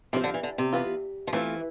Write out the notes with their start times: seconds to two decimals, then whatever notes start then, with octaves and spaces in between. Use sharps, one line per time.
0.13 C3 F3 A3 C4 F4 C5
0.24 D3
0.34 E3
0.43 D3
0.58 C3
0.73 E3 B3 F4
1.27 F3
1.33 E3 A3 C4 F4